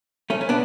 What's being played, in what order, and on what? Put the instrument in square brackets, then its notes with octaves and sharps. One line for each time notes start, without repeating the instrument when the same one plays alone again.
[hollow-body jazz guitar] A3 C#4
C#4
B3 D4